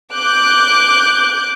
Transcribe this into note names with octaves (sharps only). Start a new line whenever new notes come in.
D6 F#6 G6